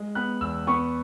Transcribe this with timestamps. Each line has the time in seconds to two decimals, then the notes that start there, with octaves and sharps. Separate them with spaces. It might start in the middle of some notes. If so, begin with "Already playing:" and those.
Already playing: G#3
0.15 B3 F#6
0.41 E2 E6
0.67 B3 C#6